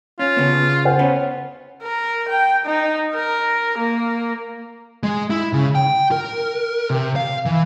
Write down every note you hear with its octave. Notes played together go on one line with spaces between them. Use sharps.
C#4 F4
C#3 B3
C5 F#5 G#5
C#4 B4
A#4
G5
D#4
A#4
A#3
G#3
E4
C#3
G5
A#4
C3
F5
E3